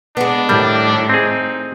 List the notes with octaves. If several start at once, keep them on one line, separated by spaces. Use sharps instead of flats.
G#3 B3 D4
A2 D#3 G3
C4 D#4 G#4